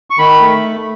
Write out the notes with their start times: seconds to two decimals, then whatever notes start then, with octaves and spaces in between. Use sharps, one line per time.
0.10 C#6
0.18 D#3 B5
0.41 A3